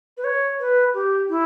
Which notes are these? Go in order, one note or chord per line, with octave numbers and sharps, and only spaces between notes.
B4
C#5
B4
G4
E4